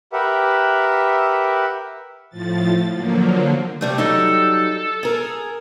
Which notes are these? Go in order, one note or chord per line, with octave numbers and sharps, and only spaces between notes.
G4 A#4 B4 E5 F#5
A2 F3 A6
D3 F3 F#3 A#3
C3 G3 A3
F#3 G3 D#4 A4
G#4 A#4